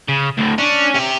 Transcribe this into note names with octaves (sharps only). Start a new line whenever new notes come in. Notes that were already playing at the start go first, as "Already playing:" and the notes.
C#3
D2 A2
C#4 D4
G4 E5